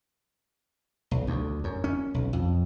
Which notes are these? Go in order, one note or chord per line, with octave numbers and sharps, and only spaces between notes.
B1
D2
F#2
C#4
B1
F2